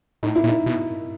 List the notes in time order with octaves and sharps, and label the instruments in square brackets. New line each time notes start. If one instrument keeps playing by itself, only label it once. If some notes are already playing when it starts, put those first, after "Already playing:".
[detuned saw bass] A2 [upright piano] D#4
[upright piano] E4
[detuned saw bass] A#2
[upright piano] D#4
[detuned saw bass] B2